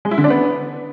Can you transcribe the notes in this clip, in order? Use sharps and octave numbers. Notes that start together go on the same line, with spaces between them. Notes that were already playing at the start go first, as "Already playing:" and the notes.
G#3
E4
D3
D4
B3